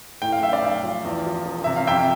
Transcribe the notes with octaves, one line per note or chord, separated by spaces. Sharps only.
A2 G5
F5
B1 E5
D5 F5
B1
F3
E2
F3
E1
C3 E5
F5
F2 E5 G5